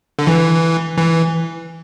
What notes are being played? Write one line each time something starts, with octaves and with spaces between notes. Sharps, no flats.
D3
E3
E3